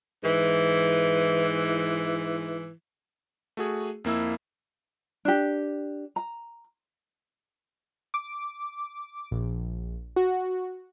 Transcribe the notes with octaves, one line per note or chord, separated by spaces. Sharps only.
G#2 E3
A3 F#4 G#4
F2 A#3 E4 E6
D4 G4
A#5
D6
A#1
F#4